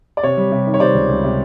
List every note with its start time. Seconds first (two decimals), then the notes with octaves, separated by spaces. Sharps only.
0.17 D5
0.23 C3 C#5
0.37 G3
0.52 C3
0.67 D#3
0.74 C#5
0.80 C3 C5 D5
0.95 C#2
1.09 C#2
1.24 C3